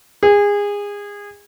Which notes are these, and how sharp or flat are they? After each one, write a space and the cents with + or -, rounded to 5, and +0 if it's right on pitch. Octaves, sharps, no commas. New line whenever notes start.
G#4 -25